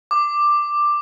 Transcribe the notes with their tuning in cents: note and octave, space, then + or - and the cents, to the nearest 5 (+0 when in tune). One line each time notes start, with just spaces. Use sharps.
D6 +10